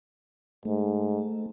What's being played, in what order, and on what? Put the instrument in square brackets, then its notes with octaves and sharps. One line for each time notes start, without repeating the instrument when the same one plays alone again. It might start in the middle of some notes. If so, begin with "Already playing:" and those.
[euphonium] G#2 [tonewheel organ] A3